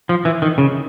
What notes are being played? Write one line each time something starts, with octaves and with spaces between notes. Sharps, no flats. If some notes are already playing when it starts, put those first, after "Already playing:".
F3
E3
D#3
C#3